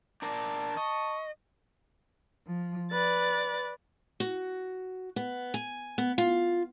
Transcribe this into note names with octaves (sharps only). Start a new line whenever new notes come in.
D4 A#4 D5 A5
D#5 C#6
F3
B4 D5 A6
F#4
B3
G#5
B3
F4